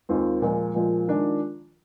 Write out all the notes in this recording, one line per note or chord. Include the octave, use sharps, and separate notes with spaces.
D#2 D#3 G#3 C4 F4
A#2 F3 G#3
A#2 F3 G#3
D#3 G#3 D4 F4